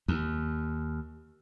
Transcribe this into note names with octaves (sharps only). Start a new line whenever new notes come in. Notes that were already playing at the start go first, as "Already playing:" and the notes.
D#2